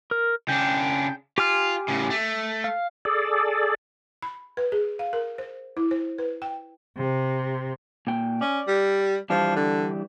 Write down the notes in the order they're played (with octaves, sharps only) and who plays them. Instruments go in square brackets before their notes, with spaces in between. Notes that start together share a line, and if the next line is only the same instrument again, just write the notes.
[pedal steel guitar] A#4
[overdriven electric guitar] C#3 D4 [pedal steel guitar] G5
[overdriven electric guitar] F4 [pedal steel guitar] G4 G#5 F6
[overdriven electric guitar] A2 C#3
A3
[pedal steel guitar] F5
[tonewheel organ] G#4 A4 D5
[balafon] B5
B4
G#4
F5
A#4
C5
E4
C5
B4
G5
[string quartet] C3
[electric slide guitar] A#2 G5
[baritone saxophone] C#4 [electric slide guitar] D5
[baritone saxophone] G3
[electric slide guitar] E3 G3 D4 [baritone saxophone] F3
[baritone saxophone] D3